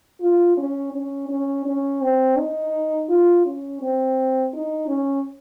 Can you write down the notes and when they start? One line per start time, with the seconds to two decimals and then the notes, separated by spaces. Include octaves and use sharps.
0.21 F4
0.57 C#4
0.93 C#4
1.29 C#4
1.66 C#4
2.01 C4
2.37 D#4
3.09 F4
3.45 C#4
3.81 C4
4.53 D#4
4.88 C#4